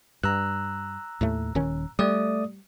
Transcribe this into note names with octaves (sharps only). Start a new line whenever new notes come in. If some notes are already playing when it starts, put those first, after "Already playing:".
G2 A#5 E6 F#6
D#2 A2 A3
D#1 D#3 C#4
G3 A3 D5 D#6